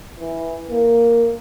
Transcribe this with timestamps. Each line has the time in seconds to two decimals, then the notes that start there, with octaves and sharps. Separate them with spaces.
0.19 E3
0.70 A#3